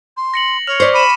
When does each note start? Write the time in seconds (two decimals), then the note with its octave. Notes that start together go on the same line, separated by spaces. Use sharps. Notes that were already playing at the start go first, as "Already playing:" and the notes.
0.17 C6
0.34 A#6 C#7 F#7
0.67 C#5 F6 F7
0.80 C5 D5 C#6 B6
0.94 B5 D6 D#7 E7